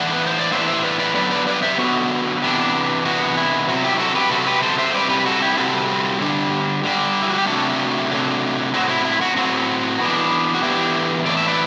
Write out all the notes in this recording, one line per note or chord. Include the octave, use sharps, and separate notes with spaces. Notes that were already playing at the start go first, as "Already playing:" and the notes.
Already playing: A2 E3 B3 D4 D5 F#5
B4
C5
D5
A2 E3 B3 D4 C5 E5
C5 E5
B4 D5
B4 D5
D3 F#3 B3 B4 D5
B4 D5
B4 D5
C5 E5
D3 F#3 B3 F#4
C3 E3 B3 D4
C3 E3 B3 D4 F#4
E4
C3 F#3 C4 F#4
E4 G4
F#4 A4
G4 B4
C3 F#3 C4 F#4 A4
G4 B4
A4 C5
C5 E5
C3 G3 C4 B4 D5
G4 B4
F#4 A4
E4 G4
C3 G3 C4 F#4 A4
D3 G3 D4
D3 G3 D4
E4
F#4
G4
C3 F#3 A3 D4 F#4 A4
C3 F#3 A3 D4
A2 F#3 C4 F#4
E4
E4
F#4
A2 F#3 C4 F#4
E3 B3 D4
F#4
E3 B3 D4 E4 G4
A2 E3 A3 C4 D5
E5
B4 D5